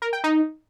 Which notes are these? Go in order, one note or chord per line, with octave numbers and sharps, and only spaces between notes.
A#4
G5
D#4